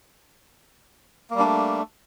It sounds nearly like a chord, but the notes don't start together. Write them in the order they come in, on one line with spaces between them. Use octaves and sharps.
A#3 G3 D4 A3